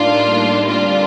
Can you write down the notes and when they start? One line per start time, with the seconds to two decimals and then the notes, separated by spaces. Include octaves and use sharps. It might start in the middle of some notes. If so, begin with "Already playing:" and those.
Already playing: A2 G3 A#3 D4 D#4 F4 A#4
0.68 D3 G3 C4 D4 F4 G4 A#4